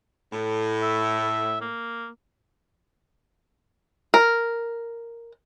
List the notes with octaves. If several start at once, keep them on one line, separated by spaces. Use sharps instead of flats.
A2
E5
A#3
A#4